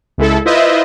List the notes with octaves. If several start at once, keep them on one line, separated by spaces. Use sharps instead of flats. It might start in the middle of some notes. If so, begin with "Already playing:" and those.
C#2 G#3 E4 A4
E4 F4 B4 C5 D#5 E5